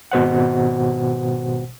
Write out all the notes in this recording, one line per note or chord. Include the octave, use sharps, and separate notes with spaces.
G#1 B2 C5 F#5